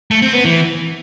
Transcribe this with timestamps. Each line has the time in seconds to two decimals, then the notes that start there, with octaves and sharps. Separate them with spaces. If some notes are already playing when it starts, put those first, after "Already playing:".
0.11 A3
0.22 C4
0.33 B3
0.45 E3